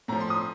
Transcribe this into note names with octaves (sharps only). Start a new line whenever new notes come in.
A2 F3 A#5
C6
D#6